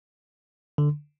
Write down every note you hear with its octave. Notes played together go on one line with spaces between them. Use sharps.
D3